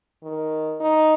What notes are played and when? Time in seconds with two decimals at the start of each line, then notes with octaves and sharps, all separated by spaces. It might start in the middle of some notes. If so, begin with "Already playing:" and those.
0.24 D#3
0.81 D#4